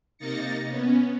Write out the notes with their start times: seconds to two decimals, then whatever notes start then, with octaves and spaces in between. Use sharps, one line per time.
0.18 C3 A#3 D#4 A6 A#6 C#7
0.68 B3 C#4